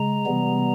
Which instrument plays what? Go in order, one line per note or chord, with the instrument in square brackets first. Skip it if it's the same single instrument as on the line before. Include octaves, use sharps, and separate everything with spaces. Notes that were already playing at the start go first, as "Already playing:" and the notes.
Already playing: [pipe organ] C#3 G#3 A#5
C3 E3 G3 B3